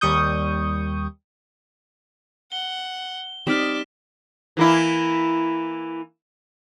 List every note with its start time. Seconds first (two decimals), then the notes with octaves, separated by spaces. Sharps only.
0.01 D#2 G3 C#6 D#6 G6
2.52 F#5 G7
3.47 G3 C4 D#4 D5 F6 B6 E7
4.57 E3 A#3 E4